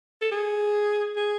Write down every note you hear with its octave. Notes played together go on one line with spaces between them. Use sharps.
A4
G#4
G#4